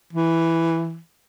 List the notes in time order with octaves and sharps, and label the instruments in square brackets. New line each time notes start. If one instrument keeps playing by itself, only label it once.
[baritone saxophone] E3